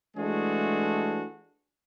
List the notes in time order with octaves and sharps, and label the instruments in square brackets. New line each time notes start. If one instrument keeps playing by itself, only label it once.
[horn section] E3 G#3 A3 D4 F#4 G#4